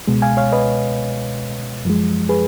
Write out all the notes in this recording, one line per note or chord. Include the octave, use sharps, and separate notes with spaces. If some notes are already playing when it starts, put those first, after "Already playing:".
C#2 B2 G#3
F5 G#5
C#5 F5
B4 D#5
F#2 F3 G#3
G#4 B4